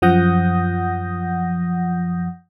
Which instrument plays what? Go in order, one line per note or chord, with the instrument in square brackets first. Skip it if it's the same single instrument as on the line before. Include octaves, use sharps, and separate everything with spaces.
[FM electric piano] F#2 F3 F#5 D#6 G6 A#6